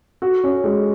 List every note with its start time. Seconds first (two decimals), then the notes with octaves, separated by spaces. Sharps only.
0.22 F#4
0.44 C#4
0.64 G#3